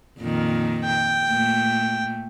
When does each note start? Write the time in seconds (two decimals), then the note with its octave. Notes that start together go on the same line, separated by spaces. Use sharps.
0.20 F2 A#2 D#3
0.84 G5
1.30 A#2 A3